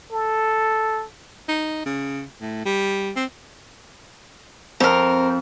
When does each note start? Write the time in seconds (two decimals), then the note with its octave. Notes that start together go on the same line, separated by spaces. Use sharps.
0.11 A4
1.48 D#4
1.86 C#3
2.41 A2
2.65 G3
3.16 C4
4.80 F2 C4 A#4 F6